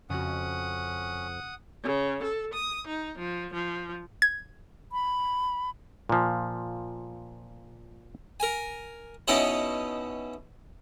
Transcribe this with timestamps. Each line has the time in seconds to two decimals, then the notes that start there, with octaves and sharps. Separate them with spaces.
0.10 F2 C#3 C#4 F#4 F#5 D#6
1.84 C#3
2.24 A4
2.54 D#6
2.90 D#4
3.19 F3
3.55 F3
4.22 G#6
4.92 B5
6.09 A#2 F3
8.40 A#4 G#5
9.28 B2 C#4 D#4 E4 C#5